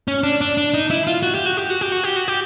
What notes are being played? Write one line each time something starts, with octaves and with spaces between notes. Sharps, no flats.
C#4
D4
D4
D4
D#4
E4
F4
F#4
G4
F#4
G4
F#4
G4
F#4
G4
F#4
G4